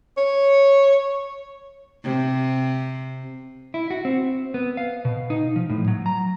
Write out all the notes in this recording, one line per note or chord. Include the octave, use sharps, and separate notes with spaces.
C#5
C3
E4
F#4
C4
B3
F5
B2
D#4
F3
A2
F#3
A#5